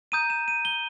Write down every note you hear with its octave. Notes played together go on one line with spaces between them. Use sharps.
A#5 D#6 G6 D#7
E7
D#7
G7